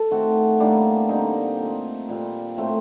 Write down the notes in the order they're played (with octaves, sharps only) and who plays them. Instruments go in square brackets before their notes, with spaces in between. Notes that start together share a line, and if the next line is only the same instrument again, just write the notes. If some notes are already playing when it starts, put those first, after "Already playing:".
Already playing: [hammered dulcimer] A4
D#3 A3 C4 F#4
A2 G3 A#3 D4
D3 G3 C4 D#4
A#2 A3 C4
A#2 G3 C4
A2 A3 C4